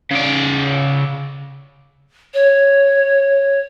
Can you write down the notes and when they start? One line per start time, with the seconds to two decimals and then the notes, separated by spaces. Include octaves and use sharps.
0.11 C#3 D5
2.34 C#5